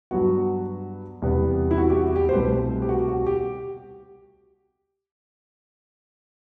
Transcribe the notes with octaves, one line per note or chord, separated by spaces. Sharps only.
G2 F#3 B3 F#4
E2 C3 G3 B3
E4
F#4
G4
F#4
G4
C5
C2 B2 A3 C4 B4
G4
F#4
F#4
G4